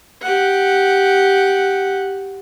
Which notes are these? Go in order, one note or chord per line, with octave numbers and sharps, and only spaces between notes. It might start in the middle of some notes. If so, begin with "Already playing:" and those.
G4 F#5